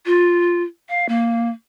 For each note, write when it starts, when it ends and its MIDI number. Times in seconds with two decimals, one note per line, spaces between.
0.06 0.63 65
0.89 1.06 77
1.09 1.49 58